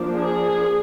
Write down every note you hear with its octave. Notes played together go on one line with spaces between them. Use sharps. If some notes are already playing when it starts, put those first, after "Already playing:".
Already playing: F3 A#3 D4
G#4